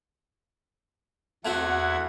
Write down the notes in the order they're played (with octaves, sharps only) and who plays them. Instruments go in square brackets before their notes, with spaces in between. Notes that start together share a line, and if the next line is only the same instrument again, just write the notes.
[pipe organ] E2 E4 G#6 [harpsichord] A3 C4 F#4 [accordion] F#5